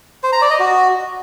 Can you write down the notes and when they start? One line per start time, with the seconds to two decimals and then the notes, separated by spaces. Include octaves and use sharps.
0.23 C5
0.32 A#5
0.41 D5
0.50 D#5
0.59 F#4